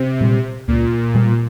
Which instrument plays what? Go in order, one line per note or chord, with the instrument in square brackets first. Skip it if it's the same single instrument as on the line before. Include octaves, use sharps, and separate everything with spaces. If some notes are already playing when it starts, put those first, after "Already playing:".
Already playing: [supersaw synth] C3
[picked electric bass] A#2 G3 C4
[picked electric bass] C#2 [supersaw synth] A#2
[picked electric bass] B2 G3